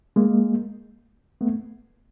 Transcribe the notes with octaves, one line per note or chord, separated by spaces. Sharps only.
G#3 A#3
A3 B3